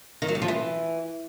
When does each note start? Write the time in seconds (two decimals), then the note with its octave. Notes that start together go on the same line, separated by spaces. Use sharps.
0.22 D#3
0.28 F#3
0.35 G3
0.42 F3
0.48 E3